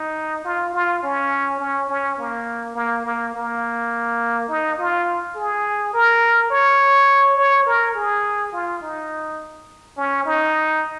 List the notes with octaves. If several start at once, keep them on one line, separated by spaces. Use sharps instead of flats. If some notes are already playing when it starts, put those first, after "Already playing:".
Already playing: D#4
F4
F4
C#4
C#4
C#4
A#3
A#3
A#3
A#3
D#4
F4
G#4
A#4
C#5
C#5
A#4
G#4
F4
D#4
C#4
D#4